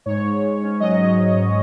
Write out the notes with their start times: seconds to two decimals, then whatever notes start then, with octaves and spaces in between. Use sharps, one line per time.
0.06 G#2 C#5
0.24 G#2
0.42 G#2
0.62 C#4
0.80 F#3 D#5
0.99 G#2
1.17 F#3
1.35 G#2